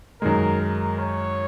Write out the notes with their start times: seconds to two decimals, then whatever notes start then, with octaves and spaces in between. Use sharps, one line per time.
0.21 F#2 D#3 G#3 A#4
0.60 A#4
0.99 C#5